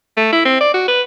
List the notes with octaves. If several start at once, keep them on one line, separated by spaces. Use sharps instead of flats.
A3
E4
C4
D5
F#4
B4